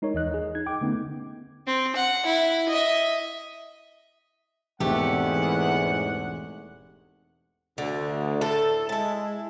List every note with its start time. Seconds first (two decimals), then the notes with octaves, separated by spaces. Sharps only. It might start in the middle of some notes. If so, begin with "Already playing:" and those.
0.02 G#3 D#4 A#4 C#5
0.14 D#2 E3 D#5 F#6
0.32 G#4 D#5
0.55 D#4 G#6
0.66 G5 D6
0.81 D3 A3 B3 C#4 D#4
1.67 C4
1.96 F#5
2.26 E4
2.69 D#5 E5
4.80 E1 E2 G#2 A3 C4 G4 F#5
7.78 D2 D3
8.41 A2 A4
8.89 G#3 E4 A5